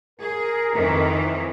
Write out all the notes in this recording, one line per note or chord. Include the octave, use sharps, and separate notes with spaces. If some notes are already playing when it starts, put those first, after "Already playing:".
G#4 A#4
F2 D#3 E3